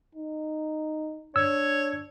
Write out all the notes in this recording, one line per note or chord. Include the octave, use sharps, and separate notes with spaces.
D#4
D4 C#5 E6